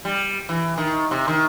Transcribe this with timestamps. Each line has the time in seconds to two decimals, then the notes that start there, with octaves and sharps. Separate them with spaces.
0.05 G3
0.49 E3
0.78 D#3
1.11 C3
1.28 D#3